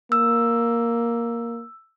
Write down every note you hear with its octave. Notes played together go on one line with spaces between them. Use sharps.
A#3 E6